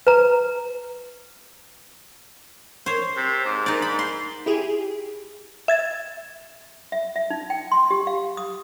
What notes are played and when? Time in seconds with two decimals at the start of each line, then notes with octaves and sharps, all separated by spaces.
0.07 B4 A#5
2.86 C5 C#5
3.17 C3
3.45 G#2
3.66 D#4 D5
3.82 B5
3.99 C6
4.46 E4 G4 G#4
5.68 E5 G#6 A6
6.92 E5
7.16 E5
7.30 D#4
7.50 G5
7.72 C6
7.91 G4
8.07 F5
8.37 D#6